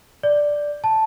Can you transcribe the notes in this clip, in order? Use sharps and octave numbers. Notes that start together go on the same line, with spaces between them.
D5
A5